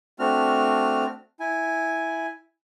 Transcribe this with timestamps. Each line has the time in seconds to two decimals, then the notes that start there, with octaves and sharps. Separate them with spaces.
0.19 A3 C4 D4 F#4 F6
1.40 E4 G#5